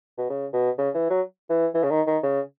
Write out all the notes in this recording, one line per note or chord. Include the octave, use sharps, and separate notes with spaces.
B2
C#3
B2
C#3
E3
F#3
E3
E3
C#3
D#3
D#3
C#3